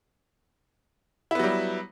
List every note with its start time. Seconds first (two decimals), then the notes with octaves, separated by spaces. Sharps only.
1.31 E4
1.35 B3
1.39 F#3
1.44 G3